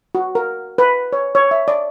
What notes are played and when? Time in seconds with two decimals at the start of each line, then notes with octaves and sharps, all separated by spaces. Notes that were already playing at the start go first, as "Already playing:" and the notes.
0.15 F#4
0.35 A#4
0.78 B4
1.13 C#5
1.35 C#5
1.51 E5
1.68 D5